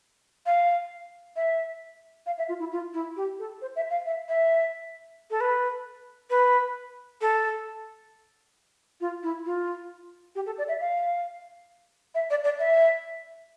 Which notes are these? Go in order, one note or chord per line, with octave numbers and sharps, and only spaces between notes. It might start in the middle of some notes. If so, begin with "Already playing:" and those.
F5
E5
F5
E5
F4
E4
F4
E4
G4
A4
C5
E5
F5
E5
E5
A4
B4
B4
A4
F4
E4
F4
G4
A4
D5
E5
F5
E5
D5
D5
E5